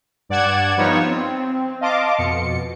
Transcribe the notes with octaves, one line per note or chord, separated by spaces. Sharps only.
G2 D5 F#5 G#6 E7
F3 G3 B3 D#4 F4 C#5
C4
D#5 F5 A5 C6 D6
F2 B2 C#7